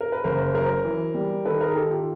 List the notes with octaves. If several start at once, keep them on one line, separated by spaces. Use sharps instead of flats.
A#4
B4
F#1 A#4 C5
F#3 A#4 C5
E3
G3
D#3 A4 B4
G#4 A#4
D#3 G4 A4
F4 G4